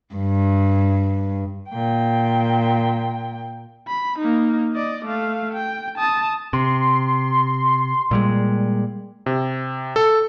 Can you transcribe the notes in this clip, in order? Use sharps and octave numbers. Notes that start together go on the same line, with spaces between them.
G2
A#2 G5
B5
A#3 D#4
D5 D#5
A3 F5
G5
A5 D#6
C3 C6
A#2 G3 G#3
C3
A4